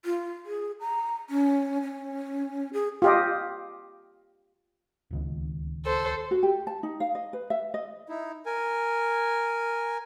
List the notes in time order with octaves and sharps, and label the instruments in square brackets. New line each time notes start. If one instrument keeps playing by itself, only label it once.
[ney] F4
G#4
A#5
C#4
C#4
G#4
[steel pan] F4 G4 D#5
[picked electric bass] D1 C#2 D#3
[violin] A4 C5
[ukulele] F#4
G4
A5
D#4
F5
D#5
B4
E5
D#5
[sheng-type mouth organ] D#4 E4
A#4 G#5